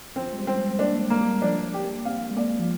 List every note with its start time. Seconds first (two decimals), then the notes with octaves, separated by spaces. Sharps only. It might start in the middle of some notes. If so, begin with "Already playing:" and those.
0.16 F3 C4
0.33 G#3
0.36 G3
0.47 C4
0.57 G#3
0.78 A#3 D4
0.93 A#3
1.00 G#3
1.10 A#3
1.21 G3
1.42 F3 D4
1.74 G4
1.84 A#3
2.05 C4 F5
2.31 G#3
2.37 A#3 D5
2.60 F3